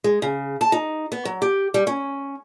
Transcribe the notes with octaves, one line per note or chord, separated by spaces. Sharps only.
G#3
C#3
A5
D#4
B3
F#3
G4
G3
C#4